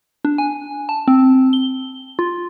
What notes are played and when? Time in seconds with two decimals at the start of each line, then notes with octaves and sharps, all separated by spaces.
0.25 D4
0.38 G#5
0.89 A5
1.08 C4
1.53 G7
2.19 F4